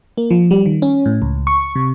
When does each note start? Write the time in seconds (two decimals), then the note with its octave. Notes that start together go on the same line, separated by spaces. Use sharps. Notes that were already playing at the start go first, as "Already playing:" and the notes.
0.17 A#3
0.30 F3
0.51 G3
0.66 D#3
0.82 C#4
1.06 A2
1.22 C#2
1.47 C#6
1.75 C3